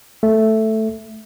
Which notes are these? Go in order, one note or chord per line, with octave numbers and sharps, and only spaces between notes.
A3